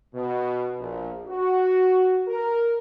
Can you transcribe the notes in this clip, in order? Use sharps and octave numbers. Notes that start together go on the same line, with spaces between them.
B2
A#1
F#4
A#4